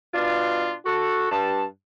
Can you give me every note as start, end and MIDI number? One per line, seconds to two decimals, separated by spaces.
0.14 0.74 47
0.14 0.74 62
0.14 0.74 65
0.86 1.30 66
0.86 1.30 69
1.31 1.64 43
1.31 1.64 81